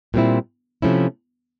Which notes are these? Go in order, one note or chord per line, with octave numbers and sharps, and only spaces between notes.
A#2 G3 C4 E4
C3 F3 A3 C#4 E4